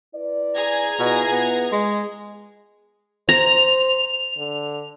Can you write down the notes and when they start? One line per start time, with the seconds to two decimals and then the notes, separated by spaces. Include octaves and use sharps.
0.15 E4 B4 D5
0.55 G#4 A#5 G#6
0.99 B2 E4 F4
1.32 B3
1.72 G#3
3.29 C5 A#5 F7
4.37 D3